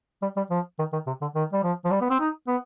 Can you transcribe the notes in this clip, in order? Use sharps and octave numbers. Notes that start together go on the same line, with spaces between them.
G3
G3
F3
D#3
D#3
C3
D3
D#3
G3
F3
F3
G3
B3
C4
D#4
B3